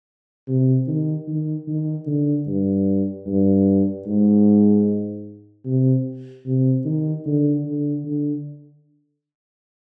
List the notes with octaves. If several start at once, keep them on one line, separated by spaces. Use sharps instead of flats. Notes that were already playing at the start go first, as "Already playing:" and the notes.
C3
D#3
D#3
D#3
D3
G2
G2
G#2
C3
C3
D#3
D3
D3
D3